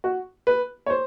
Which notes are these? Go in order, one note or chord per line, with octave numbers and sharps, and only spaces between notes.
F#4
B4
C#5
C5